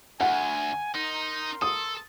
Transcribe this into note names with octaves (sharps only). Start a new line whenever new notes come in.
D2 F#5 G#5
D#4 A#4 C6
A4 D#6